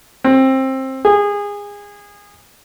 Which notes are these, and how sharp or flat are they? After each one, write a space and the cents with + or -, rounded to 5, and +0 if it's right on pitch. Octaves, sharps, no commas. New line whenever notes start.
C4 +20
G#4 -25